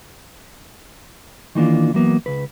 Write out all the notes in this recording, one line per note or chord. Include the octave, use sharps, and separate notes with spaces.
D#3 E3 A#3 D4 F4
E3 F#3 A#3 B3
C#2 B4